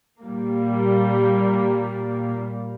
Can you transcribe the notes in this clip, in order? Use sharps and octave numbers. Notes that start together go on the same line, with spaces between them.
A#2 G3 A#3